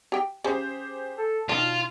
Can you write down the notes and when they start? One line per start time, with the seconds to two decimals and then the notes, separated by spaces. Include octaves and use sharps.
0.12 G4 G5
0.44 C#3 G4 G#4 C5
1.18 A4
1.49 B2 D#3 D4 F4 E7